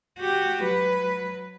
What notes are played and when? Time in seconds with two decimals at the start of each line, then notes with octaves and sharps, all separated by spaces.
0.18 F#4 G4
0.63 F#3 B4